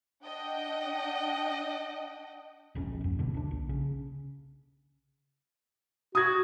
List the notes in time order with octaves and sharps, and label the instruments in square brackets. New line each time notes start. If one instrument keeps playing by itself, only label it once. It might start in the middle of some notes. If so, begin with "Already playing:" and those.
[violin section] D4 D#5 F#5 G5
[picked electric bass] E1 A#1 F2 C#4
D#1 F#2
G1 B2 D3
D2 D4
A#1
C#3
[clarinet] F#4 [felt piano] D#6 G#6